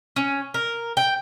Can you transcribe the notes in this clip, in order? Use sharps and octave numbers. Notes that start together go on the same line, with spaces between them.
C#4
A#4
G5